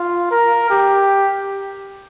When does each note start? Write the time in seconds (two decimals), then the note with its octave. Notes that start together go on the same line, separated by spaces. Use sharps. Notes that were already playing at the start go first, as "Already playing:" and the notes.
Already playing: F4
0.31 A#4
0.70 G4